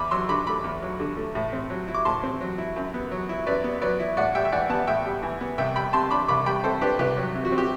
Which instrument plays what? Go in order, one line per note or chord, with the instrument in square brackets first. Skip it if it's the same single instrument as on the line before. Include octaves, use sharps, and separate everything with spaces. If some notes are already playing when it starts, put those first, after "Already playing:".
Already playing: [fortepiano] E2 B5 D6
F#3 C6 E6
D3 B5 D6
A3 B5 D6
E2
F#3
D3
A3
A2
C4
F#3
E4
D6
A2 A5 C6
C4
F#3
E4
F#2
B3
F#3
E4
F#2 B4 D5
B3
F#3 B4 D5
E4
A2 D5 F#5
G3 E5 G5
E5
E3 D5 F#5
B3 F#5 A5
A2 E5 G5
G3
E3
B3
C2 E5 G5
G3 G5 B5
C3 A5 C6
D4 B5 D6
C2 B5 D6
G3 G5 B5
C3 A4 C5
D4 G4 B4
C2 G4 B4
F#3
C3
F#4
C4
G4